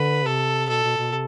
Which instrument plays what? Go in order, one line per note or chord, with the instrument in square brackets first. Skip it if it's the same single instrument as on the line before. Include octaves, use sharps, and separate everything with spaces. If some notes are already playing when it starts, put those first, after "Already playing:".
Already playing: [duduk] D3 [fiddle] B4
[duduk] C3 [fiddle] A4
[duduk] B2 [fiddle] A4
[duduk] B2
B2
C3